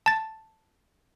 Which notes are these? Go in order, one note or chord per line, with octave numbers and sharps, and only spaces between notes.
A5 A6